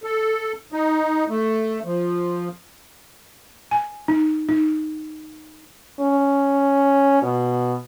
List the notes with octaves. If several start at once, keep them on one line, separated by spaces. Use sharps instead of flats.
A4
D#4
A3
F3
G#5
D#4
D#4
C#4
B2